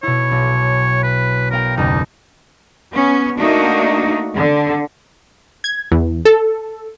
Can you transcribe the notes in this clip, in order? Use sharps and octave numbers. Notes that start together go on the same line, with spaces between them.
B2 E4 C#5
B1
B4
B3 A#4 F5 G5
F#1 D#2 D#4
B3 C#4
A3 A#3 D4 D#4 F#4
D3
G#6
E2
A4